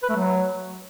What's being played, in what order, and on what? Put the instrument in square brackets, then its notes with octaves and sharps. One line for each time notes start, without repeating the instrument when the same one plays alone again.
[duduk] B4
A3
F#3